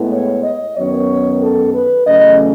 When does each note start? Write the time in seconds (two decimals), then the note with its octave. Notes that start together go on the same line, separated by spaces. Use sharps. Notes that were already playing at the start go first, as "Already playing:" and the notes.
Already playing: A2 G#3 B3
0.12 C#5
0.43 D#5
0.76 F#2 D#3 F#3 B3 C#5
1.42 A4
1.74 B4
2.07 E2 C#3 F#3 A3 C#4 D#5